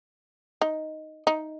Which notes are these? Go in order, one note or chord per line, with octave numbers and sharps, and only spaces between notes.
D#4
D#4